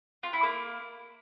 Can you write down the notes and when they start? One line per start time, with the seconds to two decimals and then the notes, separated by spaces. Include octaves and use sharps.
0.23 F4
0.33 E4
0.43 A#3